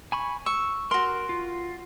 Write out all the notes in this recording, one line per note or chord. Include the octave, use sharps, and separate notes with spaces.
G#5 B5 C#6
C#6 E6
F#4 A#4 C6
F4